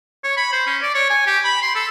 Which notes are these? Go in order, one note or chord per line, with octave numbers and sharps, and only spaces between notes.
C#5
B5
C5
C#4
D5
C#5
G#5
G4
B5
C6
A4